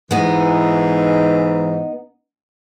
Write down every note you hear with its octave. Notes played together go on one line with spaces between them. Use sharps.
G#2 E3 B3 D#4